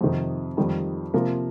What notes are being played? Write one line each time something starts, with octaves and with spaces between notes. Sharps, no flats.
F2 C3 D#3
F2 D#3 G3
C3 F3 A#3